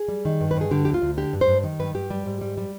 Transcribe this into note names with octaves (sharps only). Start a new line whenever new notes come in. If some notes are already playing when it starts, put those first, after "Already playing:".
Already playing: G#4
G3
D#3
G2
B4
G2 G#4
D3 G4
D2 G4
F4
D2
D3 G4
G2
C5
G2
D#3
G2 B4
G2 G4
G3
G#2
G3
G3